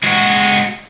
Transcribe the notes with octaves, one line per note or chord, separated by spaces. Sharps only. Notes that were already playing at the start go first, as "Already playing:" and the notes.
G#3 F#4